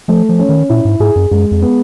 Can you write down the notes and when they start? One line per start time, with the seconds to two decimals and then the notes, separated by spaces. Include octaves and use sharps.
0.08 F3 A3
0.29 F3
0.39 C#4
0.49 D#3
0.69 A#2 E4
0.85 G#2
1.00 G#2 G#4
1.16 F#2
1.31 F#2 G#3
1.51 F2
1.62 B3